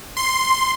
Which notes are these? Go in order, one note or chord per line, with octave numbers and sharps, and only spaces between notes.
C6